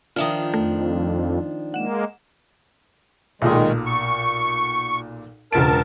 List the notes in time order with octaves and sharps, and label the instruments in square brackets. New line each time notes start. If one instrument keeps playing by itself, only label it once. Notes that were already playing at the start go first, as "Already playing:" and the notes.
[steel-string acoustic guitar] D#3 F3 D4 [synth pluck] F4 E5 D#6
[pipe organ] F2 [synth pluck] A3
[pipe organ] G#3 A#3 [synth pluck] F#5 E7
[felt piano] B1 A#2 D#6 [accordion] D#3 G#3
[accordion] C#6
[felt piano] E1 C#2 D7 [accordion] A#4 A5